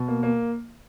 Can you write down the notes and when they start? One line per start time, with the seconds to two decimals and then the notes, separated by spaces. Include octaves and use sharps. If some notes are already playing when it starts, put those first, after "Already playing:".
Already playing: B2
0.08 A#3
0.23 A#3